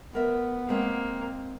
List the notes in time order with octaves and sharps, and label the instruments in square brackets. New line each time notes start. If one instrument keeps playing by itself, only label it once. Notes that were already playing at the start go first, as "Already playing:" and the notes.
[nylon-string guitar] D2 A#4 E5 [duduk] B3
[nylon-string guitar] G#3 C4 G5 [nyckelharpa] A#3